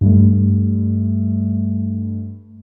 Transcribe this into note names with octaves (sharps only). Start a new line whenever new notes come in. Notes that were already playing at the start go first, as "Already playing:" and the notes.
G2 G3 A3